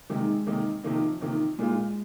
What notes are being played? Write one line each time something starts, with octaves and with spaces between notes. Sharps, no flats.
C3 D#3 G#3 A#3 D#4
C3 D#3 A#3 D#4
C3 D#3 F3 A#3 D#4
C3 D#3 A#3 D#4
A#2 G#3 A#3 F4